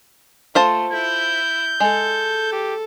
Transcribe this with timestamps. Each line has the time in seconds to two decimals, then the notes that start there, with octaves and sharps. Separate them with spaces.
0.55 A3 F4 C5 A5
0.93 E4 G6
1.80 G#3 A4
2.52 G4